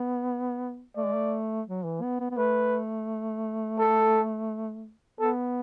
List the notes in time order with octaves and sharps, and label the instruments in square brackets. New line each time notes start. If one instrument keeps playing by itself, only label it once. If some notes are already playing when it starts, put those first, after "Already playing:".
Already playing: [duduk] B3
[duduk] A3 [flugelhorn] D5
[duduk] G#3
A3
F#3
E3
B3
B3
B3
[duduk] A3 [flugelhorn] B4
[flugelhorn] A4
[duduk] B3 [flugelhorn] A4